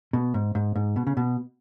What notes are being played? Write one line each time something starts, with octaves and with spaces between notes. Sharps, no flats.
B2
G#2
G#2
G#2
B2
C#3
B2